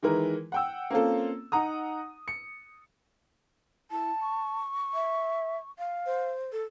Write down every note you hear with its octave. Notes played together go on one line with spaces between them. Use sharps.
D#3 E3 G#3 E4 A#4 B4
F#5 G5 E6
A#3 C4 C#4 F4 A4
D#4 F#5 A#5 D#6
C#7
E4 A5
C#6
E5
F5
C5
A4